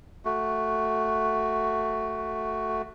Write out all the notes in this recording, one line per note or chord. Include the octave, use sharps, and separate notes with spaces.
A3 F#4